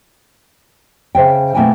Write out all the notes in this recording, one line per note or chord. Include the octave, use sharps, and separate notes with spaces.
C#3 C5 E5 G5
B2 A3 A#3 E4 G5 G#5